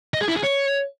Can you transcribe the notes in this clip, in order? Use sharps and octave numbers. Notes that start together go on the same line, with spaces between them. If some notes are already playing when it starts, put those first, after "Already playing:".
D#5
G#4
E4
G#4
C#5